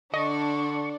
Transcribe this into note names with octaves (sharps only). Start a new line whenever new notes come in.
D3 D4 D#5 C#6